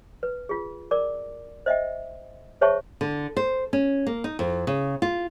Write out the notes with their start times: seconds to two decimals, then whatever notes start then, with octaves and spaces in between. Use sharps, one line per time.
0.23 B4
0.49 F4 G#4
0.91 A#4 D5 D6
1.66 C5 D#5 E5 G5
2.61 G#4 C5 C#5 E5 A5 C#6
3.01 D3
3.37 C5
3.73 C#4
4.07 A#3
4.24 D#4
4.39 F2
4.67 C#3
5.02 F4